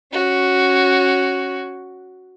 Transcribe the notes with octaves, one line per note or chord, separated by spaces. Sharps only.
C#4 F#4